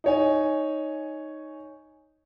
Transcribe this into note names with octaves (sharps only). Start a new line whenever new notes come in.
D#4 C#5 G#5